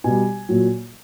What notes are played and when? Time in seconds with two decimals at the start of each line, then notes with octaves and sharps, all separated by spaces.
0.04 B2 G3 G#5
0.49 A#2 F#3